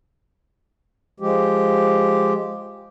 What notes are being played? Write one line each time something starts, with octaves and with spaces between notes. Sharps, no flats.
F3 G#3 G4